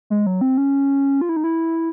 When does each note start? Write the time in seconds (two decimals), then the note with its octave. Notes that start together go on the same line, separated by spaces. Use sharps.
0.10 G#3
0.26 F#3
0.41 C4
0.57 C#4
1.21 F4
1.29 E4
1.36 D#4
1.44 E4